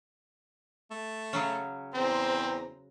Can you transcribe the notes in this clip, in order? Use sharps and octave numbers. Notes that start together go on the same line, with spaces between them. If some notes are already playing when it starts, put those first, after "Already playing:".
A3
C#3 F#3 C#4
E2 C4 C5 A#5